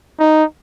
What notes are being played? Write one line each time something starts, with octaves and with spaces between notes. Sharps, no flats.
D#4